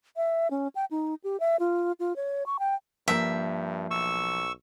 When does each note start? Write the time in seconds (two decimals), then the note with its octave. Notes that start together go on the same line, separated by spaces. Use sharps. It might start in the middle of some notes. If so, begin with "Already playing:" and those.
0.16 E5
0.51 C#4
0.75 G5
0.91 D#4
1.24 G4
1.40 E5
1.60 F4
2.00 F4
2.16 C#5
2.46 C#6
2.59 G5
3.08 G2 F3 A#3 A#4 E5
3.91 B1 C#6 E6